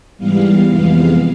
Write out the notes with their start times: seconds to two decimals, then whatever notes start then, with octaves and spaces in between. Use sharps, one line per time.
0.18 G#2 E3 G3 B3 F5
0.68 F2 C3 E3 G#3 B3 F5